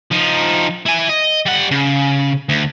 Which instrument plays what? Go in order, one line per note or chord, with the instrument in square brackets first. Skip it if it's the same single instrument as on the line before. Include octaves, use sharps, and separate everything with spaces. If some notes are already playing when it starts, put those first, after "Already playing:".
[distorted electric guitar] F3 D#4
E4 G#5
D#5
G3 F#5
C#3
D2